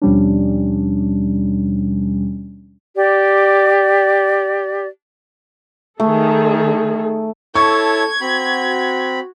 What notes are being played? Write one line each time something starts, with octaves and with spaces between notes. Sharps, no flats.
D#2 B2 F3 G3 C#4 D4
G4 D5
D#3 A3 G#4 A4
E4 A4 C#5 A5 C#6 G#6
C4 F#4 B5